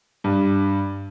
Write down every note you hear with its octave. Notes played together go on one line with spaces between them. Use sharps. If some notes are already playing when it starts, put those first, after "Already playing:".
G2